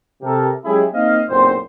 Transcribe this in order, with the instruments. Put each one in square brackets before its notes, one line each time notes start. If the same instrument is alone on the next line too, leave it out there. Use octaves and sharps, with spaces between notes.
[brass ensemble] C3 G4 A4 A#4
F#3 G#3 C#4 E4 G4 G#4
A#3 C4 D#4 D#5 F5
F#1 B1 A#2 C4 C5